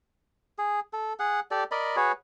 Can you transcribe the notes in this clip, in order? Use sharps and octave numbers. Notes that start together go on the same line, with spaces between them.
G#4
A4
G#4 F#5
G4 A4 D5
A#4 D5 D#5 B5
F#4 G#4 B4 C#5